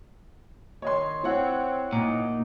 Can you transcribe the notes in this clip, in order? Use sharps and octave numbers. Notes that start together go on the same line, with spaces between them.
D#3 C#5 D#5 C6
C4 E4 C#5 F#5
A#2 D#4